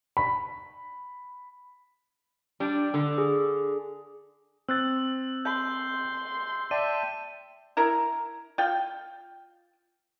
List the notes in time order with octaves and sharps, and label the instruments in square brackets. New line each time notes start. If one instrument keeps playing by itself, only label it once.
[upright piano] B5
[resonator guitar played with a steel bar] G3 D4
D3
[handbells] G#4
[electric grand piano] C4 F#6 A6 [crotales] E6
[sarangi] C6 [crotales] G6
[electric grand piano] D5 [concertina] E5 G5 A5 [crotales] D#7
[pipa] E4 A#4 A#5
F4 G5